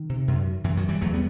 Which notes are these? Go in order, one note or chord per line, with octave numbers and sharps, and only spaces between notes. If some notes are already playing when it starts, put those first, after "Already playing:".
Already playing: D#3
C3
F#2
F#2 E3
D#3 F#3
E3 G3
E2 F#3 A3
G3 B3